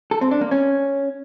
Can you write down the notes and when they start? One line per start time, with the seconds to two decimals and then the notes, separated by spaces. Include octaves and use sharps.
0.11 A4
0.21 C4
0.31 D4
0.41 A#3
0.51 C#4